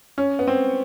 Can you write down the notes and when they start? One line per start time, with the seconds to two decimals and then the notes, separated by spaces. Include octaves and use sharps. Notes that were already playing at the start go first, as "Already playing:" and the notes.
0.18 C#4
0.39 B3
0.48 C4